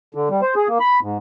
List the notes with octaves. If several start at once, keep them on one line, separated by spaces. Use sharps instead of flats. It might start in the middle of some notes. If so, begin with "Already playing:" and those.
D3
G3
C5
G#4
A#3
B5
G#2